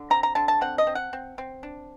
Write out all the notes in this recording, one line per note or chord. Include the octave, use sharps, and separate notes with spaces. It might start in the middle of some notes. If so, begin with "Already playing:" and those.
Already playing: D3
C4 A#5
A#5
D3 A5
A5
C4 F#5
D#5
C4
F#5
C4
C4
D4